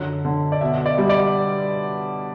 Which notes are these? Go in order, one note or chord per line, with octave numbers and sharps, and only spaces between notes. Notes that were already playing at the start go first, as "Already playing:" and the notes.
Already playing: F#2 D3
D3
D5
B2 E5
D5
G3
D5